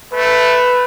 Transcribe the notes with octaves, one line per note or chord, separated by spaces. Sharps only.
A3 B4